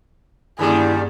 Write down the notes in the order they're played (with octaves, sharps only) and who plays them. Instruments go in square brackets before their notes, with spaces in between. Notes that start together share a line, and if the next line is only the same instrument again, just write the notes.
[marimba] G2 A#3 C#4 [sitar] D3 D#3 G3 [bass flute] E4 [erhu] G#4